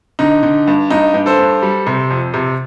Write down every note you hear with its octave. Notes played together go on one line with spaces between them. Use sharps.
D3 D#4
D3
G2
G2 D#4
G2
A4 C5
G2
G3
C3
F2
C3